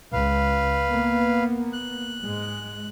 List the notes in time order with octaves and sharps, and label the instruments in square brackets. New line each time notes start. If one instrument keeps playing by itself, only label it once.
[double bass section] C#2 [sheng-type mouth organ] B4 F5
[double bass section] A#3 B3
[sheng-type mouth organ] F#6
[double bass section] G#2 G#3